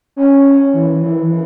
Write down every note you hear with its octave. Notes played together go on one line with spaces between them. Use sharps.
C#4
E3
E3
E3